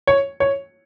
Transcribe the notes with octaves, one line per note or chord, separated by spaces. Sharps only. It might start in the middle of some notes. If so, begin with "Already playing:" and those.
C#5
C#5